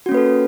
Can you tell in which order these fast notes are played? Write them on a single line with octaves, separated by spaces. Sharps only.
F#4 C#4 A#3 B4 A4